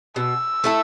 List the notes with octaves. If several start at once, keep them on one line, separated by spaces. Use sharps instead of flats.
B2 E6
A3 E4 A4